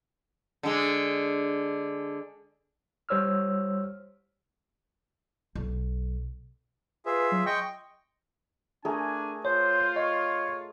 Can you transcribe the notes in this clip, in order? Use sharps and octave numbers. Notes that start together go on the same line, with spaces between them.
D3 G#3
G3 C5 C#5 E6 F6
B1
F4 G#4 B4 E5
F#3
D#5 G5 C6 C#6
A3 D4 G#4 A#4 G#5
F4 C5 C#5
C#5 D#5